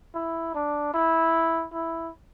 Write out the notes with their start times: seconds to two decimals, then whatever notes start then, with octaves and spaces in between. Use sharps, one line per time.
0.15 E4
0.55 D4
0.94 E4
1.74 E4